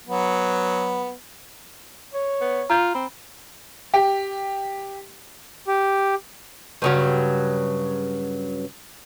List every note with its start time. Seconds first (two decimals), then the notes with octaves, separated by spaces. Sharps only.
0.07 F#3 B3
2.14 C#5
2.41 B3
2.70 F4 A#5 G6
2.94 C4 B5
3.94 G4
5.68 G4
6.82 G2 C#3 F#3